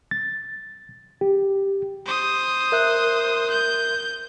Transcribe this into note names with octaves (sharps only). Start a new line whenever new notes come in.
A6
G4
C5 D#6
A#4 E5 F#6
G6